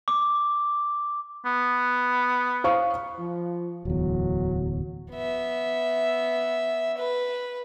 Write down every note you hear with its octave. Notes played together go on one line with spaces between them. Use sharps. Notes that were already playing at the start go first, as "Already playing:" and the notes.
D6
B3
C5 F5 C#6
F3
D1 E2 F#3
B3 E5
B4